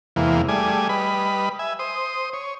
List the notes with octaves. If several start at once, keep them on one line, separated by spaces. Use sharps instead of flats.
E2 C3 E3 G#3 A#3 F5
G3 A3 G#4 D5 G#5
G3 B4 D#5 B5
E5 G#5
C5 D#6
C#5